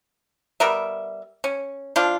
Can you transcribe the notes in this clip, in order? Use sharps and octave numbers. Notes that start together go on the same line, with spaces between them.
G3 B3 A#4 E5
C#4
F3 D4 F4